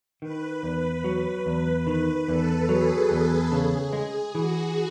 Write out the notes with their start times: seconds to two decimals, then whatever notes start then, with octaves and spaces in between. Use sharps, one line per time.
0.22 D#3 B4
0.63 E2
1.04 F#3
1.46 E2
1.87 D#3 B4
2.28 E2 A4
2.69 F#3 G#4
3.11 E2
3.52 C#3
3.93 G#3
4.34 E3 F#4